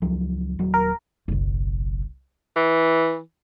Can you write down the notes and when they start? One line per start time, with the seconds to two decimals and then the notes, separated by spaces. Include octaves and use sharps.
0.02 C#2 F3 F#3
0.59 D#1 F#3
0.74 A#4
1.28 F#1 B1
2.56 E3